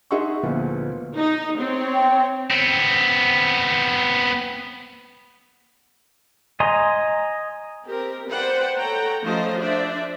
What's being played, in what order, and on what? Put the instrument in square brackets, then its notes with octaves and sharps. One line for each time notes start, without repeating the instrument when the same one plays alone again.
[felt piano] D#4 G#4 E5 F#5 C6 C#6
D2 A#2 F3 B3
[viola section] D#4
C4 C#5
[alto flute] G5
[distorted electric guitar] B3 C4
[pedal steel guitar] D#5 G#5 A#5 C6
[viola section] C4 G4 A#4
B4 C5 D5 F#5 G5
A4 C#5 F#5 G5 A#5
F3 A3 C#4 F4 C5 D#5
D4 C5 D5 E5